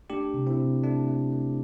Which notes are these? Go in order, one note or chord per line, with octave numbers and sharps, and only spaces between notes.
A3 D4 G4
C3
C4 E4
C3
A3 D4
A3
A3